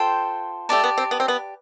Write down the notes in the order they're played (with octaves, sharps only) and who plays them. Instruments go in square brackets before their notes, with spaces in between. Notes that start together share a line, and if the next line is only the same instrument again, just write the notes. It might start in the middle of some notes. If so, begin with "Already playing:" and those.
Already playing: [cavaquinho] F4 A4 C5 G5
[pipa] A3 [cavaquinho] G4 D5 A5
[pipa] B3
C4
B3
C4
B3